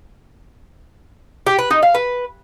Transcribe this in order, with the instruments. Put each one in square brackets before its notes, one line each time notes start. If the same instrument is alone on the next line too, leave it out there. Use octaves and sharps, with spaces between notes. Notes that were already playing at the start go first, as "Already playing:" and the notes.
[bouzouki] G4
B4
D#4
F5
B4